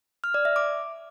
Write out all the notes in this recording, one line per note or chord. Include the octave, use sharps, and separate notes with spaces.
F6
D5
E5
D6